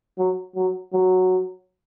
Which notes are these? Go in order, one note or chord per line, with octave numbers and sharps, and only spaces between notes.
F#3
F#3
F#3